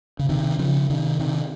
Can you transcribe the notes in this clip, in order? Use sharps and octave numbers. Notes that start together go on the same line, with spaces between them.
C#3
C3 D#3
C#3 F3
C3 D#3
C3 D#3